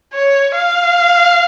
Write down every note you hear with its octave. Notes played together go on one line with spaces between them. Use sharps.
C#5
F5